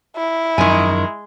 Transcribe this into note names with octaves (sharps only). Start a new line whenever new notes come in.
E4
F#2 D#3 F3 G#3 G#5